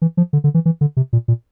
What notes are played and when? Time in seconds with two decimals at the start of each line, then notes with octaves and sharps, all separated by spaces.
0.02 E3
0.17 F3
0.33 D3
0.44 D3
0.54 E3
0.66 E3
0.81 D3
0.97 C3
1.13 A#2
1.28 A#2